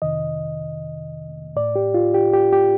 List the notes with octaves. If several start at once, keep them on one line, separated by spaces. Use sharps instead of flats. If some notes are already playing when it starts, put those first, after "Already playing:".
F2 C3 D#3 D#5
A2 D5
G4
F4
G4
G4
G4